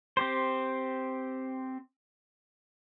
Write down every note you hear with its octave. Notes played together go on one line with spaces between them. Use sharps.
C4 G4 C5